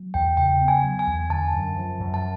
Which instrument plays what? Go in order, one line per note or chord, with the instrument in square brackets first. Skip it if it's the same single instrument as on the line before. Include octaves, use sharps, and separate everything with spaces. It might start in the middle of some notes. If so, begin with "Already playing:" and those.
Already playing: [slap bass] F#3
[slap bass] E2 [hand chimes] G5
[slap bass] C#3 [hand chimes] G5
[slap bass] B3
[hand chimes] G#5
[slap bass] F#3
[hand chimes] G#5
[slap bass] E2
[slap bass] D3 [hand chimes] A5
[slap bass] F#2
F3
F#2
[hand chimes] A5